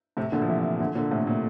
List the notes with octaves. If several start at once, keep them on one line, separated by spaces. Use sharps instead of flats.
A2 C3
A#2 D3
F3
C3 E3
A#2 D3
A#2 D3
A2 C3
A#2